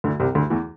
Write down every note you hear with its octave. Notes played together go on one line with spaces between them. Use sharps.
D2 D3
C2 C3
D2 D3
E2 E3